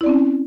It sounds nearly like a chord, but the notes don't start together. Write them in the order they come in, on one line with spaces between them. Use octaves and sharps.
E4 D5 C4 C#4